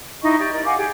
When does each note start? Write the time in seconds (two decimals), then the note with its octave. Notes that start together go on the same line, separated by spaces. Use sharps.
0.22 D#4 E4 D#5 C#6
0.39 G4 D5 C#6
0.53 A#4 D5 D#5
0.65 F5 F#5 G#5 D6
0.77 G4 G#4